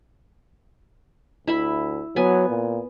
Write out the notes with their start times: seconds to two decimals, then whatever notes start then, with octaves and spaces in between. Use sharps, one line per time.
1.47 D2 E4 E5 B5
2.16 F#3 B3 G#5
2.49 A#2